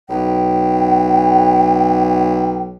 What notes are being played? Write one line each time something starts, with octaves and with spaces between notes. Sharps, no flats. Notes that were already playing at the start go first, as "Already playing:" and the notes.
B1 G5